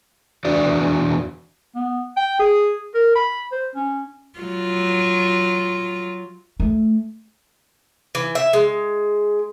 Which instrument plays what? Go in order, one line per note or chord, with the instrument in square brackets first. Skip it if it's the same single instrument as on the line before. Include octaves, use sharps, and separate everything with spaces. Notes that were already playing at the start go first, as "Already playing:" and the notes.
[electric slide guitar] E2 D4 F#4 D5
[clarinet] B3
G5
G#4
A#4
B5
C5
C#4
[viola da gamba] F#3 F4
[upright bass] A3
[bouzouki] E3
E5
G#3